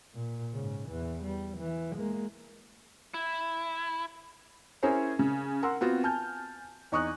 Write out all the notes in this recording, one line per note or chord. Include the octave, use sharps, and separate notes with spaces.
A#2
G#2 C#3
E2 E3
G3
E3
G#3 A#3
E4
C#4 E4 G#4 A#4 C5 C#5
C#3
A#4 F#5 C6 E6
B3 C4 F4 F#4
G#5 A5 F6 G6
E2 D#4 C#6 D#6 F#6